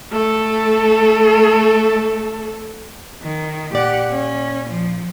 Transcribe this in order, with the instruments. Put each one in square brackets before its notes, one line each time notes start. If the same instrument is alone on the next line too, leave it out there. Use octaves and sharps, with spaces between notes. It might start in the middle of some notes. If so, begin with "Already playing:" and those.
[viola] A3 A4
[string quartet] D#3
[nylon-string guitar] A#2 D5 [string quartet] G4 F#5
[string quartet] C#4
F3